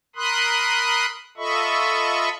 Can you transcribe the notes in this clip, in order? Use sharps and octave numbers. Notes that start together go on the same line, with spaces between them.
A#4 B5 C6 D#6 F#6
F4 A4 D#5 E5 B5 C#6